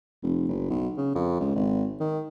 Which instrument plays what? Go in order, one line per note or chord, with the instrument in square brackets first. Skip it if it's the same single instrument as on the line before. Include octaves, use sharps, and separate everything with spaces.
[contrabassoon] F1
F#1
B1
C#3
F2
C#2
G#1
D#3